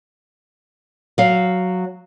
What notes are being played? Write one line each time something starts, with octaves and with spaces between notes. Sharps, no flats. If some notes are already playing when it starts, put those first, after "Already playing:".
F#3 F5